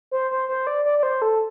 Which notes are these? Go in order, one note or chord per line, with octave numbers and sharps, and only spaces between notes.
C5
C5
C5
D5
D5
D5
C5
A4